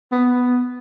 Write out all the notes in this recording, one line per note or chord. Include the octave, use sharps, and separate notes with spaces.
B3